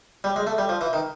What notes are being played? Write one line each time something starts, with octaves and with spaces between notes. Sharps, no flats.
G3
G#3
A3
G3
F3
E3
D#3